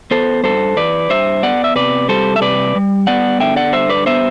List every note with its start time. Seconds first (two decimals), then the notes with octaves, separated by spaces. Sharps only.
0.11 B3 A4 C5
0.43 G2 A4 C5
0.76 E3 B4 D5
1.10 G2 C5 E5
1.43 B3 D5 F#5
1.64 E5
1.75 C3 B4 D5
2.09 G3 A4 C5
2.36 E5
2.41 C3 B4 D5
2.75 G3
3.07 B3 D5 F#5
3.40 D3 E5 G5
3.56 D5 F#5
3.73 G2 C5 E5
3.89 B4 D5
4.06 B3 C5 E5